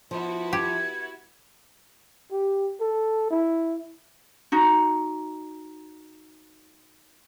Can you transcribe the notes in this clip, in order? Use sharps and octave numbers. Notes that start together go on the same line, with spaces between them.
F3 B3 E4 F#4
G4 G#6
G4
A4
E4
D#4 F#4